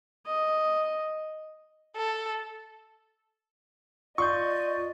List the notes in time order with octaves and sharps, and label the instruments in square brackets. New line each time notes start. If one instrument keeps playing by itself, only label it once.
[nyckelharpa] D#5
[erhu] A4
[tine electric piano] F4 C6 G6 [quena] D5 [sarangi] D#5 [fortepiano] C#6